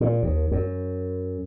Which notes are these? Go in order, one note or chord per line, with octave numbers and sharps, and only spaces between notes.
A#2
D#2
F#2